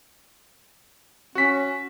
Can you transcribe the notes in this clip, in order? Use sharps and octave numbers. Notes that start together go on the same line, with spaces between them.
C#4 F#4 B6